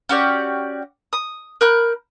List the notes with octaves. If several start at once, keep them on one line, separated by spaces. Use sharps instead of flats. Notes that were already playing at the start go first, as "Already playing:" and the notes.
C#4 F#4 G4 D5
D#6
A#4 B5 F#6 G6